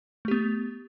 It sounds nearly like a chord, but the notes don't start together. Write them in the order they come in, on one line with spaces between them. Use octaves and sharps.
A3 G4 B3